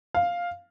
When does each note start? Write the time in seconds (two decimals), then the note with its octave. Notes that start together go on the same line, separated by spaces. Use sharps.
0.15 F5